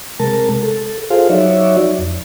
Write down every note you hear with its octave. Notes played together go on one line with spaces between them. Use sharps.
C3 G#3 A#4 A5
A4
F4 G#4 A4 C5 F5
F#3 D#4 F#4 C#5 D5 E5
F2